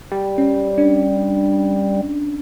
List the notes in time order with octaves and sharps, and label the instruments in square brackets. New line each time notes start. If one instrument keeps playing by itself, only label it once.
[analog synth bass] G3
[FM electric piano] C#4
D4